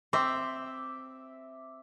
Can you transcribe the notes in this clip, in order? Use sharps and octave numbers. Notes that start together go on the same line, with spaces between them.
C4 E5 D6